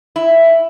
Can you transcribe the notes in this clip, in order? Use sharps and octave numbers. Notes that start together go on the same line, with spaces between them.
E4